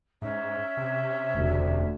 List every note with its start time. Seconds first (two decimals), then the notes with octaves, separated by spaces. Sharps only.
0.22 G#2 C#4 E5
0.77 C3
1.34 E1 D2 A3